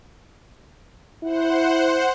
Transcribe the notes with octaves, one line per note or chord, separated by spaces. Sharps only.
E4 C5 F#5